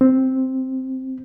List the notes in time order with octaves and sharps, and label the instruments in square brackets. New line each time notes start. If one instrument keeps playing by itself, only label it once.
[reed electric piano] C4